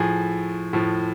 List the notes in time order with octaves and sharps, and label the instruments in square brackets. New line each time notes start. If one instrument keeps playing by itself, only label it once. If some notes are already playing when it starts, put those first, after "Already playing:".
Already playing: [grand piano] A2 F3 G#4
A2 F3